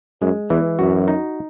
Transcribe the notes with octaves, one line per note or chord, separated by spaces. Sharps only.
F#2 G#3
E2 E3
F#2 F#4
D#4